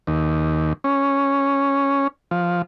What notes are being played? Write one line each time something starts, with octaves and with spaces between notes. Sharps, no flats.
D#2
C#4
F3